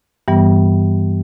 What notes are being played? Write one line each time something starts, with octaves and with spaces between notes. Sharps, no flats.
G2 E3 G3 B3